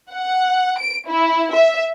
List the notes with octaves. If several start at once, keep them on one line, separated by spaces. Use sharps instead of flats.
F#5
D7
E4
E5